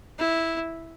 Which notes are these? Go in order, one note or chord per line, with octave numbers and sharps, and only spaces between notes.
E4